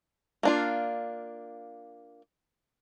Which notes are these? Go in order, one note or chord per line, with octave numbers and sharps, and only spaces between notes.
A#3 D4 F4